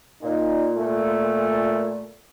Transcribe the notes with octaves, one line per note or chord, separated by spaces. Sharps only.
A#2 D#4
A3